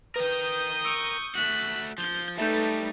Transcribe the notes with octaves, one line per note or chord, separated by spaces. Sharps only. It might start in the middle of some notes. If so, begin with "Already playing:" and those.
A#4 B4 G5 D#6 G6
C#6 E6 D7 F7
A3 F#4 F#6 B6
F3 G6
G3 A3 D#4 A4 B4 E5 G6